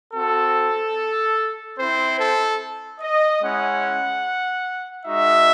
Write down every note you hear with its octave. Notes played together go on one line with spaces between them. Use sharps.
C4 F#4 A4
C4 E4 C5
A4
D#5
G#3 C#4 E4 F#5
G#3 D#4 F#4 E5